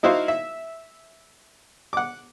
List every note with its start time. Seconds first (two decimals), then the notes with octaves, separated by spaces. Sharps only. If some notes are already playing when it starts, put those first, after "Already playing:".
0.03 D#4 E4 F#4 C5 F5
0.28 E5
1.93 F#5 D6